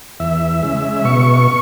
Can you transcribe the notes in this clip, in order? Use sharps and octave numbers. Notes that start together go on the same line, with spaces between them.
E2 E5
C#3 G#3
B2 C#6